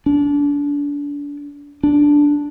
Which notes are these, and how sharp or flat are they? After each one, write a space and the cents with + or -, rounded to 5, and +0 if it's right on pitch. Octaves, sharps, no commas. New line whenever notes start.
D4 -30
D4 -5